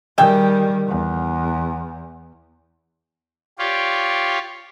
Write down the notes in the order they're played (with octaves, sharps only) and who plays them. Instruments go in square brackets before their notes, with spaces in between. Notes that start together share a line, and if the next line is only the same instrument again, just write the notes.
[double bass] D#3 G3 [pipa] G#4 E5 G5
[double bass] E2
[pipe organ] F4 G4 C#5 D5